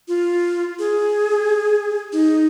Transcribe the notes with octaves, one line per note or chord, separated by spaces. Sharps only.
F4
G#4
D#4